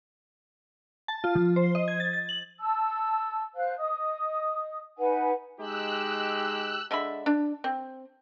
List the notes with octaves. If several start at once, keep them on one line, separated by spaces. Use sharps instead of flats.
A5
F4
F3
C5
D#5
G#6
A6
A6
F#7
A5 E6
C5 F5 F#6
D#5 D#6
D#4 B4 F#5 G#5
G#3 D#4 G4 E6 F#6
D3 G#3 E5 B5
D4
C4